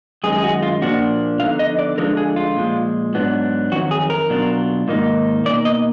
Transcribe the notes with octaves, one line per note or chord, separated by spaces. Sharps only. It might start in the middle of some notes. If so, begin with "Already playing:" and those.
F#2 D#3 G#3 D#4 G#4
G#4
F#4
F4
A#2 F3 A#3 D4 F#4
D3 F3 B3 D#4 F5
D#5
D5
D3 F3 G#3 D4 F4 A#4
G#4
F4
A#2 F3 G#3
G#2 F#3 B3 D4
F2 D#3 F#3 F#4
G#4
A#4
B2 F#3 D4 F4
G#2 D#3 A#3 D#4
B2 A#3 D#4 D5
D#5